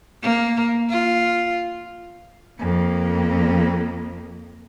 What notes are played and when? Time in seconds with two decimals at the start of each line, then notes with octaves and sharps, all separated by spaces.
0.22 A#3
0.90 F4
2.60 F2 A#3